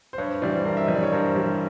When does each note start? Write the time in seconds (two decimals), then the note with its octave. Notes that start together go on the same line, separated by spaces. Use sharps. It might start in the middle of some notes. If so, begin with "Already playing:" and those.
0.13 C5
0.18 G2 B4 C#5
0.42 E3 G3 C5 D5
0.65 G2 A#4 C5
0.77 E5
0.85 E3 G3 D#5
0.95 D5
1.03 C#5
1.12 G2 A#4 C5
1.36 E3 G3